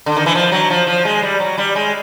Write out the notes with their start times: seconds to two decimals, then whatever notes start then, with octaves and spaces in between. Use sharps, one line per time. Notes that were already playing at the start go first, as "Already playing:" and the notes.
0.06 D3
0.17 D#3
0.26 E3
0.35 F3
0.52 F#3
0.70 F3
0.87 F3
1.05 G#3
1.22 G3
1.40 F#3
1.58 G3
1.75 G#3